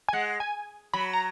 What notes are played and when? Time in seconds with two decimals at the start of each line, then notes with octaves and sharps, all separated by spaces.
0.08 G#5
0.13 G#3 F#5
0.40 G#5
0.94 F#3 B5
1.13 A#5